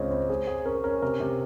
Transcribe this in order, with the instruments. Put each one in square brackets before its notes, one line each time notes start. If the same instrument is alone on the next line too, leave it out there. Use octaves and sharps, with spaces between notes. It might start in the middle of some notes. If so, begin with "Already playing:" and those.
Already playing: [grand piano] C#2 C#3 C4 [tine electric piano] C#5 D#5
[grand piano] C4
G#4
G#4
[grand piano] C#4 [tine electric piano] A#4
[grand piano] C#4 [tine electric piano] A#4
[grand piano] C3 [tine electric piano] A#4
[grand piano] C3